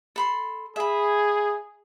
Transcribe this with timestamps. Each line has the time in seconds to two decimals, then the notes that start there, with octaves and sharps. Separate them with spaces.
0.16 A4 B5 C6
0.76 G#4 E5 B5